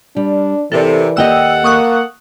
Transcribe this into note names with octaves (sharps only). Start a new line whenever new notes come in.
G3 D4
C3 E3 A4 A#4 D5
D#2 G4 A4 D#5 F#5 G5 E6
A#3 C#6 D#6 F#6